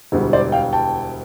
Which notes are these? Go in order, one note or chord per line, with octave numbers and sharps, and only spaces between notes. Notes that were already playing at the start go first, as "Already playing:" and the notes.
E1 D2 D3 G3
C5 D5
F5 G5
G5 A5